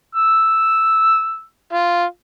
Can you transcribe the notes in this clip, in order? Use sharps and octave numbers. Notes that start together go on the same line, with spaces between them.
E6
F4